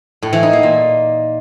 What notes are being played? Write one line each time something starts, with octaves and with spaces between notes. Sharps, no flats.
A2
E3
D#4
A#3
A#2